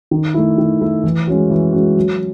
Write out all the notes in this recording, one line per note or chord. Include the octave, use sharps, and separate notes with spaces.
D#3
A3 E4
D#3
A3 E4
E3
G#3 C#4 F#4
E3
G#3 C#4 F#4
F#3